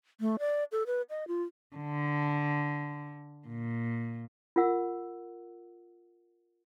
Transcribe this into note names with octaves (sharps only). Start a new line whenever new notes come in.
A3
D5
A4
B4
D#5
F4
D3
A#2
F4 A#4 F#5 E6